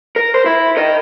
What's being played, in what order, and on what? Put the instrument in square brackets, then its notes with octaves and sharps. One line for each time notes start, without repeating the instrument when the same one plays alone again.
[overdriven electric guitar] A#4
C5
E4
A#4 D#5